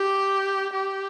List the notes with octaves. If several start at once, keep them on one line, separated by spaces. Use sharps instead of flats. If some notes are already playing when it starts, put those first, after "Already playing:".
Already playing: G4
G4